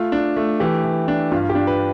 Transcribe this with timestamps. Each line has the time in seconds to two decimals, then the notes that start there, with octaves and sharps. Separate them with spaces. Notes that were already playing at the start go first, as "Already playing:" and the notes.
Already playing: A3 F4
0.12 D4
0.37 A3
0.60 E3 G4
0.84 E3
1.08 D4
1.31 G2 F4
1.49 G4
1.55 D4
1.67 B4